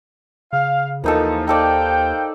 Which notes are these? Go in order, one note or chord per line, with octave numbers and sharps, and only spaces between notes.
C#3 F5
D#2 E3 F3 A#3 D#4 A4
D#4 A4 C5 D5 F5 G5